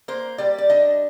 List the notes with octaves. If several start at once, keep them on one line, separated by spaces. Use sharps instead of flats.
A#3 C5
G3 D5
D5
D4 D#5